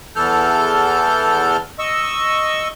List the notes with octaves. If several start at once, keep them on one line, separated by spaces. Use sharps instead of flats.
E2 E3 A4 F6 G6
D#5 C#6 E6